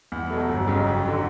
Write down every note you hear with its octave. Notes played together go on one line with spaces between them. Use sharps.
E2
B2 F#3 A3
G1
F2 C#3 F#3
F2
D3 F#3